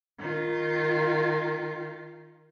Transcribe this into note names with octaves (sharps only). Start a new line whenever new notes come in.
D#3 F4